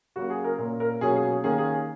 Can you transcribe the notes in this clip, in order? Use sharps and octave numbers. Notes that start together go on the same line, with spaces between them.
C#3 F#3 A#3 F#4
G#4
A#4
A#2 A#3 C#4 A#4
A#4
B2 F#3 A#3 C#4 G#4
G#4
D#3 A#3 C#4 G#4
G#4